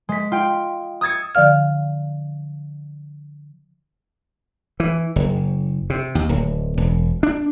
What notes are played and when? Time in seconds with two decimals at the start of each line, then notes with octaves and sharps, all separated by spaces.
0.09 G#3 B6
0.32 F4 G5
1.01 D#6 E6 G#6 A6 C#7
1.35 D3 F3 D5 F5 F6
4.80 E3
5.16 F#1
5.90 C3
6.15 D#2
6.29 D1
6.77 E1
7.23 D4